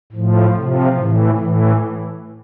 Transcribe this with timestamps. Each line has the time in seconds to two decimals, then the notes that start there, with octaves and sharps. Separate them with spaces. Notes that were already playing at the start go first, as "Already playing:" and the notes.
0.13 A2 F3
0.55 C3 F3
0.96 A2 E3
1.39 A2 E3